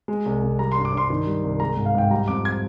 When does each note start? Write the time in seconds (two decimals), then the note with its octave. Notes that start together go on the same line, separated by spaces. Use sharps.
0.08 G#3
0.26 C2
0.43 C2
0.59 G3 A#5
0.72 C6
0.76 G2
0.85 D6
0.92 G2
0.97 C6
1.10 D#3
1.27 G3
1.44 C2
1.60 G#3 A#5
1.77 G#2
1.85 F5
1.95 G#2 G5
2.10 G3 A#5
2.28 F2 D6
2.45 G#6